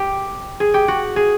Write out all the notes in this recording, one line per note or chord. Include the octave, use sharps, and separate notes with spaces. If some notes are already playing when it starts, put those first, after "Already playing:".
Already playing: G4
G#4
G4
F#4
G#4